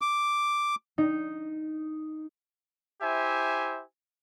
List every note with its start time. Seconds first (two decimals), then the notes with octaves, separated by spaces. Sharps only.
0.01 D6
0.98 D#4
3.02 E4 G4 C5 E5 G#5